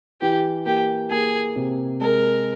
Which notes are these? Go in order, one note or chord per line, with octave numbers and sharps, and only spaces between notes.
E3 G4
A#3 G4
A#3 G#4
C3
G#3 A#4